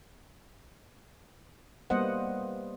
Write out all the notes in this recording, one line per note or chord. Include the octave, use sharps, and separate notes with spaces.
G3 A#3 B3 C5 D#5 F#5